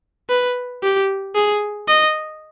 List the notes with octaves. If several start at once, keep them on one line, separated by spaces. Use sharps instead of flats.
B4
G4
G#4
D#5